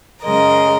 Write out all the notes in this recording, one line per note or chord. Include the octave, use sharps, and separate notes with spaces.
F#2 C#3 G#3 A#4 D#5